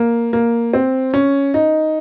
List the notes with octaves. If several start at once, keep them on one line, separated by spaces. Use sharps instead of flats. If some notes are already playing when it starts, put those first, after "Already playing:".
Already playing: A#3
A#3
C4
C#4
D#4